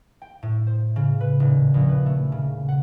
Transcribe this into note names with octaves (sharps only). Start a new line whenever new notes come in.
G5
A2
C5
C#3
B4
D#1
A#1
B4
A3
C#3
F#5